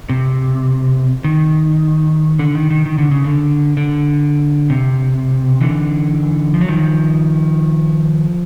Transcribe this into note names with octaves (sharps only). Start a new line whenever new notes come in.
C3
D#3
D3
D#3
D#3
D#3
D3
C#3
D3
D3
C3
D3 E3
F3
F#3
D#3 F3